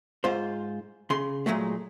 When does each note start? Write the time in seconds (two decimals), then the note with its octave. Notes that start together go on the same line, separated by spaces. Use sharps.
0.24 G#2 F4 C5
1.10 C#3 C6
1.46 A#2 E3 F#3 G#3 A3